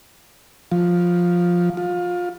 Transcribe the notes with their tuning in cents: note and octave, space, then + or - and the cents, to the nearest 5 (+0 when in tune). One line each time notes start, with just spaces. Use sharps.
F3 +10
F4 +25